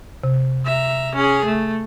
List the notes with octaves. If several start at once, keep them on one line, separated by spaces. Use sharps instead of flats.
C3
E5 A#5
C#4 G#4
A3